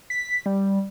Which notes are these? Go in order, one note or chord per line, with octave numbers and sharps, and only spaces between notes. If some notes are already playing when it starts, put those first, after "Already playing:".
B6
G3